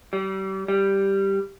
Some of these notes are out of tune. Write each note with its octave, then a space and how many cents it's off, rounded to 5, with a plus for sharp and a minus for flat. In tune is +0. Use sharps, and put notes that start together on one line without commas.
G3 -35
G3 +0